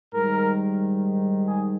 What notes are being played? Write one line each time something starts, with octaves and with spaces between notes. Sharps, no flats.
G#2 D#3 G3 A#4
G#4